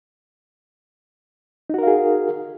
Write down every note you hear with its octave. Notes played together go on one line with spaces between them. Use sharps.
D#4 F#4 G#4 A#4 F5